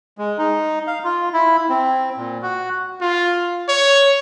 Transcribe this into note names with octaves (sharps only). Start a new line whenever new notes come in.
G#3
D#4
F5
F4
E4
C4
A#2
F#4
F4
C#5